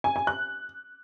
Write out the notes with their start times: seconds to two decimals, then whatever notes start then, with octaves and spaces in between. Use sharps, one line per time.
0.04 G#5
0.16 G#5
0.27 F#6